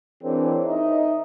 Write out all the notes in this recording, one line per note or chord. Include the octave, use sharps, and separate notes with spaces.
E3 C4 D4 G#4 A#4 C#5
D#4 D#5 E5